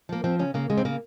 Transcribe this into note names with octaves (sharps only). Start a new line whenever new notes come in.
F3 A#3
F3 C4
C#3 C#4
C#3 A#3
C#3 G#3
C4
C#3 A#3